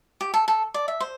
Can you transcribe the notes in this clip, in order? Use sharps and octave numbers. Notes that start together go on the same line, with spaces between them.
G4
A4
A4
D5
E5
C5